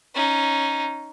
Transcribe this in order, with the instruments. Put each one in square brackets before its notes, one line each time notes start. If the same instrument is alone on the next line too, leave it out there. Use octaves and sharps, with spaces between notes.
[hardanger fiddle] C#4 D#4